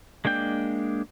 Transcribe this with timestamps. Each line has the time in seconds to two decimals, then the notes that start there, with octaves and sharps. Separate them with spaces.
0.25 G#3 A#3 D4 G5 G6